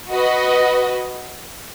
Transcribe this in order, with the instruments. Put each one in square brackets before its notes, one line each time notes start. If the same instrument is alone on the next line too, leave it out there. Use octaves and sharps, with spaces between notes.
[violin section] F#4 B4 D#5